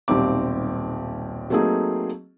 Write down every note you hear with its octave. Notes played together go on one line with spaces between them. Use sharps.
D#1 B1 G3 C4 D6
F#3 A3 A#3 C4 D#4 G#4